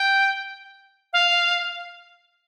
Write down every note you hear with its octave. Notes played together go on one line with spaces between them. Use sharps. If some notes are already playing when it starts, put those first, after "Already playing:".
Already playing: G5
F5